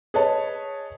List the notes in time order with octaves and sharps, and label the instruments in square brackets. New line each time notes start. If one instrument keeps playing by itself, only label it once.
[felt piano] G#4 B4 C#5 D#5 A5